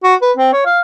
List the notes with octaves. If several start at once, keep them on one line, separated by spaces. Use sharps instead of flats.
F#4
B4
C4
C#5
F5